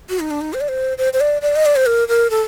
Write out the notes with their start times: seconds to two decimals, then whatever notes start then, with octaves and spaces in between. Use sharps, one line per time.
0.09 F#4
0.20 D#4
0.31 D4
0.41 D#4
0.54 C5
0.61 D5
0.68 C5
0.98 C5
1.13 C5
1.20 D5
1.42 D5
1.56 D#5
1.66 D5
1.76 C5
1.86 A#4
2.08 A#4
2.30 A4